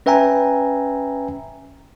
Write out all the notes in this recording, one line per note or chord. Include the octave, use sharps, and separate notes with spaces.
C#4 B4 E5 G5 G#5 A#5